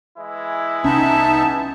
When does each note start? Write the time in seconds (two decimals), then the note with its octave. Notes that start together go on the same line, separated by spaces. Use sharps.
0.17 E3 G#3 E4
0.84 C2 B3 C#4 D#4 E5 A5